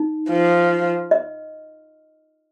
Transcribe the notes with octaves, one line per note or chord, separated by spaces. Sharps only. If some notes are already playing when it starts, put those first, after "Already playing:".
Already playing: D#4
F3
D#5